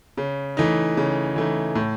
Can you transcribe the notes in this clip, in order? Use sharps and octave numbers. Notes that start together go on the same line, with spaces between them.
C#3
E3 A3 D#4
C#3
E3 A3 D#4
A2